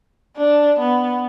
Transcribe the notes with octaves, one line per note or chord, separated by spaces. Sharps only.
D4
B3